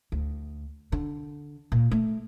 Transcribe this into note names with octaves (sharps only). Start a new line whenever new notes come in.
D2
D3
A#2
A3